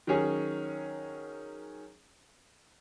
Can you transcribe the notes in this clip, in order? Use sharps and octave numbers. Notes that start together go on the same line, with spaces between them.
D#3 F#3 C#4 G#4